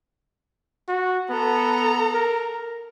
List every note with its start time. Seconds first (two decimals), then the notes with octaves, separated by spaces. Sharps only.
0.88 F#4
1.30 B3 A4 A#5
2.14 A#4